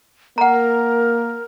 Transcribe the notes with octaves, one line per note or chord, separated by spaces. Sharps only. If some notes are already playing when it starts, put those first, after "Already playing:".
A#3 A#4 F#5 A#5